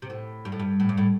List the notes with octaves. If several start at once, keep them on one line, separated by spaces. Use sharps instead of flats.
C3
A2
G2
A2
G2
A2
G2
A2